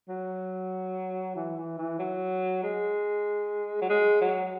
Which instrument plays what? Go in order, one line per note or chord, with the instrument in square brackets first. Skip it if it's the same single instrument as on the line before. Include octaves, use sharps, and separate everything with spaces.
[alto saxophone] F#3
E3
E3
E3
F#3
G#3
F#3
G#3
F#3